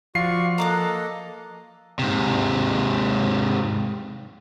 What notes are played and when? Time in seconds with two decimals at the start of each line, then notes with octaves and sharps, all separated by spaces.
0.15 F3 F4 F#4 D5 C#6 C7
0.58 A#3 A4 D#5 A#5 D6 F#6
1.99 G#2 C3